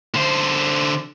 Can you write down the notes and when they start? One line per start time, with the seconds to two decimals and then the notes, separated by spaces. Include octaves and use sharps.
0.15 D3 C5